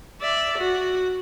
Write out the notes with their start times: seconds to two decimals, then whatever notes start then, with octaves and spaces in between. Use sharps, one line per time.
0.21 D5 E5
0.58 F#4